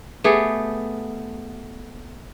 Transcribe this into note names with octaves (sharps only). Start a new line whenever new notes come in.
A3 B3 G4 G#4